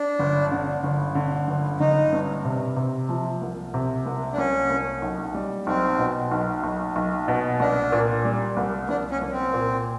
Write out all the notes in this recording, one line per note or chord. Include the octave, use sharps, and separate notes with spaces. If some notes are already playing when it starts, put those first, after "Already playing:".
Already playing: D4
G1
D3
G1
D3
G1
G1 D#4
G2
C3
C3
F3
C2
C3
C2
D4
C2 C#4
C2
B1
G3
B1 C4
B2
B1
B1
B1
B2
C2 D4
A#2
G3
C2
C2 D4
C#4
C2
C4
A#2